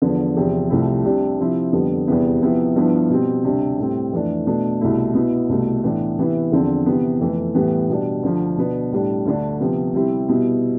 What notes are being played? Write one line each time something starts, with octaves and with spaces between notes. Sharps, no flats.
E2 D3 F3 B3
E2 C3 F3
C2 C3 F3 A3 E4
C3 G3 D4
C3 F3 C4 E4
F2 D3 G3 B3
E2 C3 G3 B3 E4
C3 F3 B3 E4
G2 F3 B3 E4
B2 G3 C4
D2 C3 G3 D4
A2 G3 C4
F2 E3 A3 D4
B2 A3 D4
C2 B2 A3 E4
B2 B3 E4
C2 B2 A3
A2 E3 B3 D4
C3 E3 B3 E4
E2 D3 F3 C4
C3 E3 B3
F2 E3 A3
A2 E3 G3 B3
B2 G3 D4
D2 D3 F3
B2 B3 D4
A2 G3 D4
D2 D3 A3 D4
C3 F3 B3
C3 G3 C4 E4
B2 G3 B3 E4